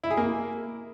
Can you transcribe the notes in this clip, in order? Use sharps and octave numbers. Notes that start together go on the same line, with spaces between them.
E4
G#4
A#3